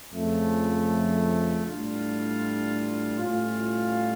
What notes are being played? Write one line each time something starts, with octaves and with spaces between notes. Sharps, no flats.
F2 C#3 F3 A3
A2 G3 D4 F4
A2 G3 C#4 F4